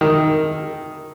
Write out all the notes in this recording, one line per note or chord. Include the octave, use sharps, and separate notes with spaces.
D#3